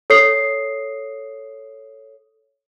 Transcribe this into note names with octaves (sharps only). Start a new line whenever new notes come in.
A4 C#5 D#6 C7